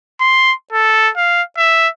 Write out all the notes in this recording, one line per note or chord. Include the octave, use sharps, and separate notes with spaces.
C6
A4
F5
E5